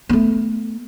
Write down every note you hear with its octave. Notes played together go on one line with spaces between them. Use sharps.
A3 B3